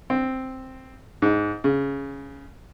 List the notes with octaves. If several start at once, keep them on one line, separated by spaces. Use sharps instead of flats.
C4
G#2
C#3